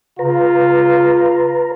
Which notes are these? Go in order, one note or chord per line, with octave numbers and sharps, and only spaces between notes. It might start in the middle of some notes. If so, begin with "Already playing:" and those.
C#3 F4 B4 A#5